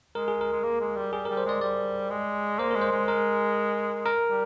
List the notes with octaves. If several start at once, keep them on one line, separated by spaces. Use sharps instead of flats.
G#3 A#4
G#4
A#4
G#3
A#3
G#3
G3
G3 G#4
G3 A#4
C5
G#3 D5
G3 D5
G#3
A#3 C5
G#3 A#4
C5
G#3
A#4
A#4
G3